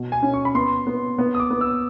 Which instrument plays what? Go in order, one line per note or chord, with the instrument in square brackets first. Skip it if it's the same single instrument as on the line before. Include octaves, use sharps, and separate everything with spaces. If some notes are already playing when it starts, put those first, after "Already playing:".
Already playing: [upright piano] B2
[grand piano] G#5
[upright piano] C#4
[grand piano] C#6
B5
[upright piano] B3 [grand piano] C6
[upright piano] B3
B3
[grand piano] D#6
D6
[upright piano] B3
[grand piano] E6